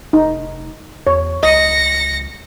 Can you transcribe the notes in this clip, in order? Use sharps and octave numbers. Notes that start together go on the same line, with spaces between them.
F1 D#4
E2 C#5
C#2 D#5 A#6 C#7